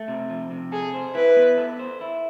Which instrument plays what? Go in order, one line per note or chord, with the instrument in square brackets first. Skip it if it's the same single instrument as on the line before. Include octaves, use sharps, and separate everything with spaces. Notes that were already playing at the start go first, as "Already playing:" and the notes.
Already playing: [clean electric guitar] A3
C3
F3
C3
[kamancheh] G#4 [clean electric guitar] A4
[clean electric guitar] C5
[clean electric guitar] E4 [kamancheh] B4
[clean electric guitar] B3
A4
C5
E4